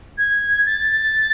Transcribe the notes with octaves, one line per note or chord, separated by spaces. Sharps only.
G#6
A6